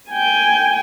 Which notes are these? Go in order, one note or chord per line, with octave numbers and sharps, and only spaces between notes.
G5 G#5